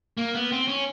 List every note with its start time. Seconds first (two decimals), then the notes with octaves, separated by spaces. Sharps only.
0.17 A#3
0.34 B3
0.52 C4
0.68 C#4